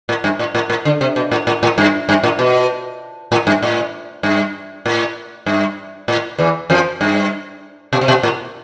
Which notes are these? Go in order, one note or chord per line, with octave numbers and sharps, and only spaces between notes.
A2
G2
A2
A2
A2
D3
C3
B2
A2
A2
A2
G2
G2
A2
B2
A2
G2
A2
G2
A2
G2
A2
E2 E3
F2 F3
G2
B2
C3
B2
A2